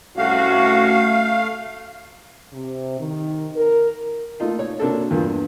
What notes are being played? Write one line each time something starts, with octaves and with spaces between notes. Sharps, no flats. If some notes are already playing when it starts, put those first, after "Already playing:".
C2 A3 C#4 F#4 F5
C3
D#3
A#4
A3 A#3 D#4 F4
C#5
C3 A#3 D4 F#4 A4
E2 G2 A#3 F4